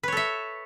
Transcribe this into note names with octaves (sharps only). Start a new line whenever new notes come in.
A4 B4 C#5 E5